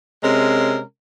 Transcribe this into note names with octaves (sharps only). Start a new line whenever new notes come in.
C3 G#3 C#4 A#4